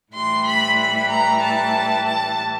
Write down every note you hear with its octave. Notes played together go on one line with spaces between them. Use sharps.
A2 E3 G3 C6
B5
B5
A#5
A5
A5